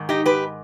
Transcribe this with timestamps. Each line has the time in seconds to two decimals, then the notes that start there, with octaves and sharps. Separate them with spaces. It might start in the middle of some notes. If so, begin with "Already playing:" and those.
Already playing: G#2 D#3
0.09 D#4 G4
0.26 G4 B4